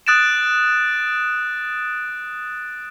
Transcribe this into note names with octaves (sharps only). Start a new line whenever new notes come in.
D#6 F#6 A6 D7 E7